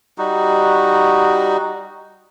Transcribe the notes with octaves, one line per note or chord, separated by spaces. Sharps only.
G3 D#4 F#4